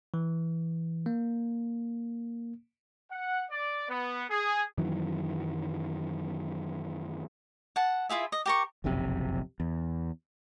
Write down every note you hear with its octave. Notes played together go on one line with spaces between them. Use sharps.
E3
A#3
F#5
D5
B3
G#4
F#2 D#3 E3 F#3
F#5 A5
E4 F4 G#4 E5
D#5
G4 A#4 C#6
F#1 B1 F2 C3
E2